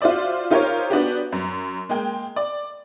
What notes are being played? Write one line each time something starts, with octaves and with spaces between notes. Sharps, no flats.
F4 F#4 C5 D5 E5
D#4 F4 G4 A#4 C5 C#5
B3 D4 F#4 G4
F#2
G#3 A#3 G5
D5